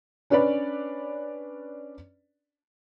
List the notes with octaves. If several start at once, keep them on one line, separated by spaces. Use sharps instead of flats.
C#4 D4 B4 C#5 D5 B5